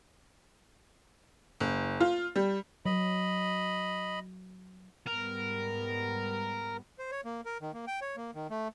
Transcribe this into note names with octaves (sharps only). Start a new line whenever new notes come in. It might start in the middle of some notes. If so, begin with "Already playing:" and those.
F#1
F4
G3
F#3 D#5 B5
G#2 G3 B3 A#4
C5
C#5
A#3
A#4
D#3
A#3
G5
C#5
A#3
D#3
A3